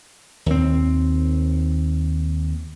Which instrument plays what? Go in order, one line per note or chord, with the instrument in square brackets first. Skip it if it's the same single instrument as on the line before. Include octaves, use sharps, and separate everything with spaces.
[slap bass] D#2 C4